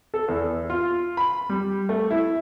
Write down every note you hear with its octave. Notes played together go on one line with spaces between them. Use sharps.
A4
E2
F4
B5
G3
A3
E4